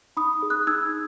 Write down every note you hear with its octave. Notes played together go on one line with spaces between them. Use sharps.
D#4 B5 D#6
G#4
D#6 F#6
D#4 E6 G#6